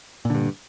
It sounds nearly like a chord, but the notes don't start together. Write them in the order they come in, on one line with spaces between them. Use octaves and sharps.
A#2 D3 G2